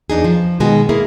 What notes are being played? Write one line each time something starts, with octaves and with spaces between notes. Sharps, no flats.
E2 D4 D#4 G#4
F3
B2 D#3 G#3 F#4 G#5
A#3 E4 G#4 A#4